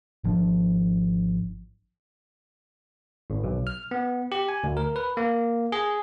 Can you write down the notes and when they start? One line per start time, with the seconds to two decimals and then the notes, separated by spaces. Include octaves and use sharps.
0.24 G#1 F3 D4
3.30 G#1
3.44 B1
3.67 F6
3.91 B3
4.32 G4
4.49 G#5
4.64 D2
4.77 A#4
4.96 B4
5.17 A#3
5.72 G#4